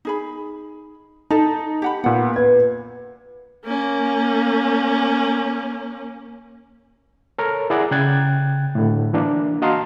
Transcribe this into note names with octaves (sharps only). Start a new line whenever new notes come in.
D#4 G#4 B5
D#4 E4 A4 A5
G4 F#5 B5
A#2 B3 F#5
B4 G#6
A#3 C#4
A4 A#4 C#5
E4 G#4 D5 F#5 A#5
C#3 G5 F#6 G#6 A6
A2 D3
E3 A#3 D4
F#4 D#5 F5 A5 A#5 C6